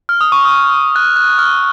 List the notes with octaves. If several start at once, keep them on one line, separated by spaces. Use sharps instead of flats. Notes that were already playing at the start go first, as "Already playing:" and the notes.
F6
D#6
C#6
D#6
F#6
F#6
F6